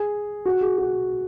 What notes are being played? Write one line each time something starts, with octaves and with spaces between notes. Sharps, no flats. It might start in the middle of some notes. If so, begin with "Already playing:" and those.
Already playing: G#4
F#4
G#4
F#4